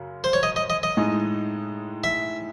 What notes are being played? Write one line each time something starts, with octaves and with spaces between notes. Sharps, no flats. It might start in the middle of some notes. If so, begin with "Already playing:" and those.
Already playing: F#2 C#3
C5
C#5
D#5
D#5
D#5
D#5
A2 G#3 D#4
E5